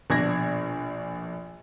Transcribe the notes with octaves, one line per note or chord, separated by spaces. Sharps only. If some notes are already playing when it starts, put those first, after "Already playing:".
A#1 B2 D4 G#6 A#6